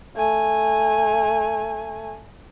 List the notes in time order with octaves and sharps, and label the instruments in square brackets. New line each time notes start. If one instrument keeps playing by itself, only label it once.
[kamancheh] A3 G#5